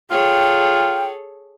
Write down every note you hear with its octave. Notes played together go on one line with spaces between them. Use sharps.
F4 G#4 A4 C#5 G5